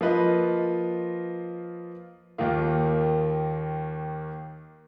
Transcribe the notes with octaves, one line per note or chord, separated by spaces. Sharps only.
F3 A#3 F4 B4 D#5
D#2 D#3 A#3 F4